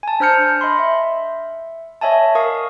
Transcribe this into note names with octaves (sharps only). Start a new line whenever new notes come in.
G#5 A5
D4 C5 A#5 F6 G6 C#7
D#5 B5 C6
E5
C#5 D#5 E5 G#5 A5
A#4 F5 C#6 D#6